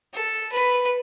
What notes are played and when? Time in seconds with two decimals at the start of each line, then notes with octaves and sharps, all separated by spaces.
0.14 A4
0.52 B4